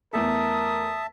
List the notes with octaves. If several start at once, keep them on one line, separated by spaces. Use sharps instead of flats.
E2 A3 A4 A#4 E5 A5 D#6